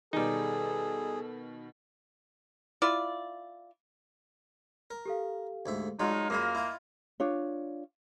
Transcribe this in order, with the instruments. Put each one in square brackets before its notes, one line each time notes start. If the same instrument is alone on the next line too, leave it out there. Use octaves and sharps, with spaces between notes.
[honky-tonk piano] B2 D#3 [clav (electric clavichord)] G3 D#4 [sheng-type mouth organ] G#4 [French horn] A4
[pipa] E4 F4 D5
[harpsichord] A#4
[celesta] G4 A4 F5
[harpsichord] D2 G#2 E5
[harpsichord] F#3 G#3 [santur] A3 F4 D5 [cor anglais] D#4 [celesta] C6
[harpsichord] F#2 G#4 B5 [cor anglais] A#3 [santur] D#5 F5
[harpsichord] E4 F4
[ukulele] D4 F4 C#5